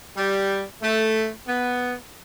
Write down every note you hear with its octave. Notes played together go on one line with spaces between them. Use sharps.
G3
A3
B3